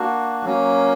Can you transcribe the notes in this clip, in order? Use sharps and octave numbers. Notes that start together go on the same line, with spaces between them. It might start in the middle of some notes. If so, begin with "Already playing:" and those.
Already playing: A#3 D4 F#4
F#3 A#3 C#4